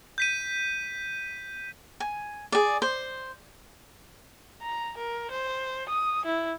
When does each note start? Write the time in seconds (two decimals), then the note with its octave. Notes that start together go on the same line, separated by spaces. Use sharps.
0.18 G6 B6 D#7
2.00 G#5
2.52 G#4 D5
2.82 C5
4.62 A#5
4.97 A#4
5.31 C5
5.89 D#6
6.25 E4